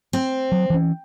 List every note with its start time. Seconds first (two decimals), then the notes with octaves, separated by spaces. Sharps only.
0.13 C4
0.52 F#3
0.70 E3 C#4